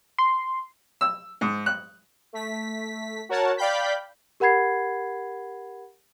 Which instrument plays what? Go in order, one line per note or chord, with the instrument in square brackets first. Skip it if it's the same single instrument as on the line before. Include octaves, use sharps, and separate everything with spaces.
[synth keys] C6
[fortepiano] E6
G#2
F#6
[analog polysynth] A3 B6
F#4 A#4 C#5 F#5 A5
D5 F5 G5 B5 G6 B6
[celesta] G4 A#4 F#5 B5 G#6 C7